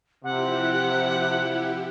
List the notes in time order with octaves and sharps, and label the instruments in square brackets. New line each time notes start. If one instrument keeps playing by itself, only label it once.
[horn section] C3 [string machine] F3 E4 G4 [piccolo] F#5